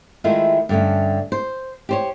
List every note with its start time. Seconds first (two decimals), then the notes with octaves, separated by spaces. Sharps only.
0.24 D#3 G#3 A3 E4 F4
0.69 G2 D3 A3 C#4
1.32 C5
1.89 G4 C5 C#5